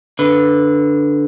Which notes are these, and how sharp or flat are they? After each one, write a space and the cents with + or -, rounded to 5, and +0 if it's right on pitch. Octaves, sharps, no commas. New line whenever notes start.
D3 -5 B4 +0